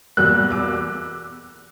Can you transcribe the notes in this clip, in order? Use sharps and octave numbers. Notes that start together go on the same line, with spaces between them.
E2 B2 G3 A#3 E6 F#6
D6 E6